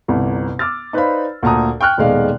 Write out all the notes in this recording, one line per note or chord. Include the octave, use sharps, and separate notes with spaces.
G1 C2
D6 E6 F6 A6
D#4 B4 C5 D5 F5 B5
D2 A#2 A5 A#5 D#6
G5 C#6 F6 F#6
D#1 B2 D#3 G#3 D5 F5